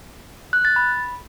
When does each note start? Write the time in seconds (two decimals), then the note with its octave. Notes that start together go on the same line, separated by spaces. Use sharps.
0.53 F#6
0.65 A6
0.76 B5